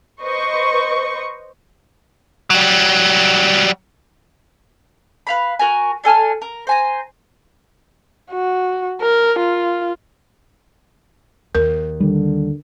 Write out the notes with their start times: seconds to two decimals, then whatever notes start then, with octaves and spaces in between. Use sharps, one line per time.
0.21 B4 C5 D#5 C#6
2.50 F#3 G3
5.27 B4 F5 B5
5.59 F#4 A#4 G#5
6.04 D4 A4 G#5 F6
6.42 A#4
6.67 C5 G#5 A#5
8.31 F#4
9.01 A#4
9.39 F4
11.55 D#2 A#4
12.00 D3 D#3 G3